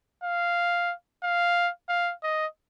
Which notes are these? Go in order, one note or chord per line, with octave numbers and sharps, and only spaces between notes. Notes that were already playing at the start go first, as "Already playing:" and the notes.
F5
F5
F5
D#5